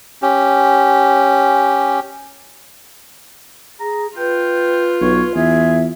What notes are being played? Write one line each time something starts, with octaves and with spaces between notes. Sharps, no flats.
C#4 G4
G#4 A#5
F4 B4 G5
B1 C#5
E2 G#4 E5